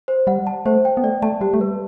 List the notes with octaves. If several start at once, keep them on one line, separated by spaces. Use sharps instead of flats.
C5
G3 F#5
A5
A3 C5
G5
B3
A3 D5
A3 A5
G3 G4
A3
G3 B4